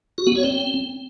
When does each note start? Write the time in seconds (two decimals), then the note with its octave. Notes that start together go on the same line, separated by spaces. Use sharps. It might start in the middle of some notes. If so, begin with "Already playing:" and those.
0.18 F#4
0.27 B3
0.35 C#5
0.44 C4